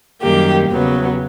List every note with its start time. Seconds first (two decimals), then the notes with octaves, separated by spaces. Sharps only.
0.21 F#2 D#3 G3 A#3 G4
0.69 E2 C#3 F#3 B3